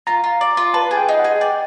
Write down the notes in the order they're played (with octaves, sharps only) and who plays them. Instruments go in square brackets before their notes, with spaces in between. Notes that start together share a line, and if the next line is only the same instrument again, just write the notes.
[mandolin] F4 [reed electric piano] A#5
[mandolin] F4
D5
F4
[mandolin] B4 [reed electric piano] A5
[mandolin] G#4
[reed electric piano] G5
[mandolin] D#4
[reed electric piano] F#5
[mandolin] G#4
[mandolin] D5 [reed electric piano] G5